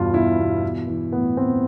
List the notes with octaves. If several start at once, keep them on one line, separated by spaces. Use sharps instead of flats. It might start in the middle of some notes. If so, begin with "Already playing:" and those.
Already playing: E2 G2 B2 F4
B2 E4
B2
E3
E3
A2 B3
A2 C4